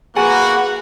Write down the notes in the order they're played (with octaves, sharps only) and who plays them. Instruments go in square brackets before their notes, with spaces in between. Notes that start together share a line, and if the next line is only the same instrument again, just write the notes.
[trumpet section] A#3 F#4 [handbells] G#4 [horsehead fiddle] B4 F#5 [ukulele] G#5